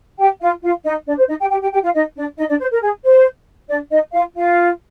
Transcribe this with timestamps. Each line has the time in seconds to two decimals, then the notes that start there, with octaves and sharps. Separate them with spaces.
0.19 G4 G5
0.41 F4 F5
0.63 F4 F5
0.85 D#4 D#5
1.07 D4 D5
1.18 C5
1.28 D#4 D#5
1.40 G4 G5
1.50 G4 G5
1.61 G4 G5
1.73 G4 G5
1.83 F4 F5
1.95 D#4 D#5
2.16 D4 D5
2.38 D#4 D#5
2.48 D4 D5
2.60 C5
2.71 A#4
2.81 G#4
3.04 C5
3.69 D4 D5
3.91 D#4 D#5
4.13 F4 F5
4.35 F4 F5